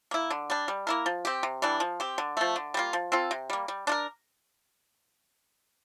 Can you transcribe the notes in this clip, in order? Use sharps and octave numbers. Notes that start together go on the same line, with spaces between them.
A#3 E4
D3
G3 D4
G3
A#3 E4 A#4
F3
C4 G4
C3
E3 G3 D4
F3
C4 G4
D3
F3 A3
D3
G3 A#3 F4
F3
C4 F4 A4
C3
G3 A#3
G3
D4 F4 A#4